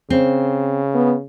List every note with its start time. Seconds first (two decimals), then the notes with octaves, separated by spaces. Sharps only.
0.10 C#3 C4
0.94 B3